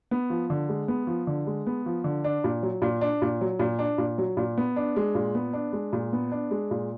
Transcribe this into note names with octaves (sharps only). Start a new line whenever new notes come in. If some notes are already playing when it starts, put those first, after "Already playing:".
B3
F3
D3
G#3
B3
F3
D3
G#3
B3
F3
D3
D4
A#2
F#3
A#2
D4
A#2
F#3
A#2
D4
A#2
F#3
A#2
B3
D4
G#3
A#2
B3
D4
G#3
A#2
B3
D4
G#3
A#2